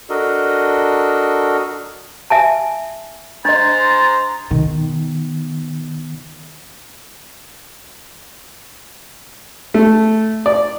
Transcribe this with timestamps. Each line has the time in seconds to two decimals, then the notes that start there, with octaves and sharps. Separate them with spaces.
0.10 D4 F#4 A4 A#4 D#5
2.30 E5 G#5 A5
3.45 G#3 D4 C5 D#5 A#5 A6
4.51 B2 D#3
9.74 A3
10.46 D5